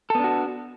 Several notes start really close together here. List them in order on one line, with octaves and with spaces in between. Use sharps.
A4 B3 D4 F#4